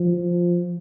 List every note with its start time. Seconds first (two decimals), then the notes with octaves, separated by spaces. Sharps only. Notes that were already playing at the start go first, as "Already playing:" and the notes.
Already playing: F3